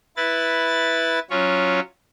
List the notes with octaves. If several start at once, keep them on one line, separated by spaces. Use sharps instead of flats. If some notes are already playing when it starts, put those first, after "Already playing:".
E4 B4 A6
F#3 C#4 F4 C#5